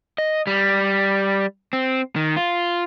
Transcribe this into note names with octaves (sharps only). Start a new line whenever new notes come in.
D#5
G3
C4
D#3
F4